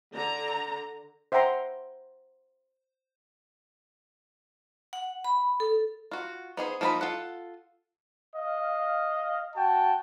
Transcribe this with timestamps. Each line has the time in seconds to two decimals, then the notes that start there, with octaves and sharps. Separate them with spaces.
0.15 D3 A#5
1.32 C5 E5 F#5 G5 A#5 C6
4.93 F#5
5.25 B5
5.60 A4
6.11 F4 F#4
6.57 B3 D#4 G#4 C5
6.81 F3 A#3 D#4 A4 B5
7.01 F4 A4 F#5
8.36 D#5 F5
9.55 F#4 G5 A5